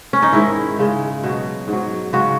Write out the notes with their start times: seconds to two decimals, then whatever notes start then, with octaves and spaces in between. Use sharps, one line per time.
0.13 C#4
0.22 D#4
0.33 G#2 D#3 G#3 E4
0.79 C#3 G#3
1.23 B2 F#3
1.68 G#2
1.73 F#3
2.13 C#3 G#3 F#4